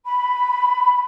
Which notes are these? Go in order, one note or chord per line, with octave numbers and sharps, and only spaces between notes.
B5